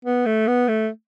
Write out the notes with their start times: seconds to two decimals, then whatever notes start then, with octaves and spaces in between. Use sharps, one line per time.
0.05 B3
0.26 A3
0.47 B3
0.68 A3